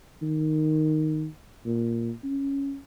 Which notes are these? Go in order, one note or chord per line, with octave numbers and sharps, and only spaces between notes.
D#3
A#2
C#4